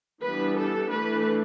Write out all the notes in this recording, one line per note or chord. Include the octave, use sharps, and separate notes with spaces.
E3 G3 B3 D4 B4
A4
E3 A3 D4 B4